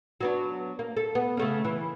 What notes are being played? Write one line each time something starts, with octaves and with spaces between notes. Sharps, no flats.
F#3 B3 D4
A#3
A4
B3
C#3 A3 C#4
E3